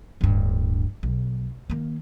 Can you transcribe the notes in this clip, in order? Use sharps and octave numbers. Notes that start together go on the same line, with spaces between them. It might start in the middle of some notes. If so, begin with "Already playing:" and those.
D1 G2
B1
D#3 A#3